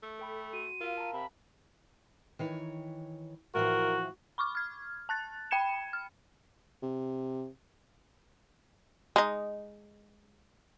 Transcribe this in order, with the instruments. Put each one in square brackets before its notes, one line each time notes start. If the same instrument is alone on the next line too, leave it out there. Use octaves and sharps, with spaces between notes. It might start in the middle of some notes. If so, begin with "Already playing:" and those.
[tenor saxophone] A3
[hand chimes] A4 G5 B5
[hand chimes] F#4 [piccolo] D#7
[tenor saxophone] F4 [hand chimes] A#4 F5
[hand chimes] A5 A#5
[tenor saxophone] C3 [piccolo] B5
[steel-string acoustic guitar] D#3 E3 C#5
[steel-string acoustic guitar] A2 E3 F3 [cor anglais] F#4 [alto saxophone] A#4
[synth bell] B5 C#6 D6 F6
F6 G#6
A5 F#6 A6
G5 B5 G#6 C#7 E7
F6
[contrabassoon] C3
[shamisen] G#3 D#4